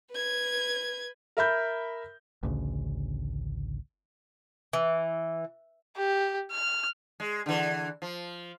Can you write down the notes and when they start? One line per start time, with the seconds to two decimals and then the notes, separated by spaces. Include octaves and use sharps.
0.11 B4 G#6
1.37 A#4 E5 B5 G6
2.43 A1 D2 C#3
4.73 E3
5.97 G4
6.51 F6
7.20 G#3
7.46 D3 E3
8.02 F3